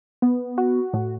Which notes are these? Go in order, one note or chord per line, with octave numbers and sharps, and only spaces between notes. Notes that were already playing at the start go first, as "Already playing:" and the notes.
B3
F#4
A2